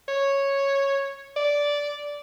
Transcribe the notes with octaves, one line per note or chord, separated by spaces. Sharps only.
C#5
D5